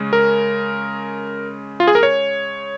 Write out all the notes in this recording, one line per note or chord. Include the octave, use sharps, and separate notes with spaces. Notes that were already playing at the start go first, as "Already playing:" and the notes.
Already playing: C#3 G#3 C#4
A#4
F4
G#4
A#4
C#5